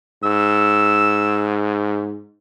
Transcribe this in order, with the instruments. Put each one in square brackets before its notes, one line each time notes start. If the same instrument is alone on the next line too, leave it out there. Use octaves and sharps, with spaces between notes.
[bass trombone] G#2 [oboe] E6